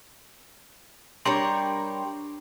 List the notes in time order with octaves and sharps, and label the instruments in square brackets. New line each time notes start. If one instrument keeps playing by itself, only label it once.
[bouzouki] G3 A#4 C#5 [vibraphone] D4 [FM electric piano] G5 A#5 C6